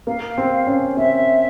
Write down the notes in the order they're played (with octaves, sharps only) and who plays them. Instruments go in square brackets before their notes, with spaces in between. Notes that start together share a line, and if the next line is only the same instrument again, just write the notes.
[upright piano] A#3 [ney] F5
[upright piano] C4
C#4
[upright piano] C4 [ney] E5